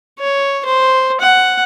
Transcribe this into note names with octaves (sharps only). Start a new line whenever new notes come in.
C#5
C5
F#5